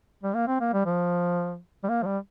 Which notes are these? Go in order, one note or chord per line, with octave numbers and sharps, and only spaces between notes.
G3
A#3
C4
A#3
G3
F3
G3
A#3
F3
G3